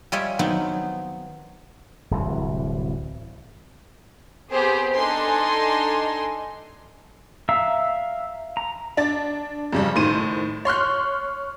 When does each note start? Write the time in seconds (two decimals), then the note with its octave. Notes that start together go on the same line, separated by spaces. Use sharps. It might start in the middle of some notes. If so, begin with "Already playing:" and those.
0.12 G3 G#3 F4 C#5 D#5 E5
0.39 D#3 F#3 B3 C4 D#4
2.11 D1 C2 E3
4.51 B3 C4 G4 G#4 C5
4.94 D4 D#4 A4 G#5 C6
7.49 E5 F5 A#5 E6
8.57 A#5
8.97 D4 A6
9.72 F2 C#3 G3
9.96 A2 D#3 C5 D#7
10.65 C#5 C6 F6 F#6